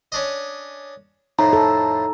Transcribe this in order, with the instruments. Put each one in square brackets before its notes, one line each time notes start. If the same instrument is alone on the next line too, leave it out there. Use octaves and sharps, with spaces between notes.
[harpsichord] C#4 D4 D#5
[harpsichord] F2 A2 [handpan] D#4 [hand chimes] A#5
[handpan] A4